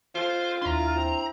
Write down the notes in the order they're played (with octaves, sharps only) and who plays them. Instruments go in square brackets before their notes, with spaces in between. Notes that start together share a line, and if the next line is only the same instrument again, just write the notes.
[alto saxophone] F4 [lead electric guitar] C5
[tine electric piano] D#2 D4 [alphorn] E4 [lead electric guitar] A#5 C6
[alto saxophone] C4